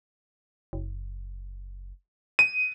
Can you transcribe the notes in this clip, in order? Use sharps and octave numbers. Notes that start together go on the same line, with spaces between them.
F#1
D#7